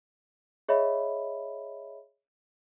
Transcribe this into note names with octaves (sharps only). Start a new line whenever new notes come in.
G#4 C#5 D#5 E5 B5